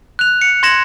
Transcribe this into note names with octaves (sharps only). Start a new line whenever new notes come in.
F#6 F7
C#7
C6 G#6 A#6 E7 F#7